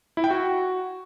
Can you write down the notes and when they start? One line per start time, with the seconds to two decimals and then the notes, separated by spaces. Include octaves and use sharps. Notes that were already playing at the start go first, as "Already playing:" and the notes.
0.17 E4
0.24 G5
0.30 F#4